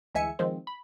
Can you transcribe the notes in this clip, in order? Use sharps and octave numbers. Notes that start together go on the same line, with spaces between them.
D2 E3 G#3 E5 G#5 C#7
D#3 F3 G#3 C4
B5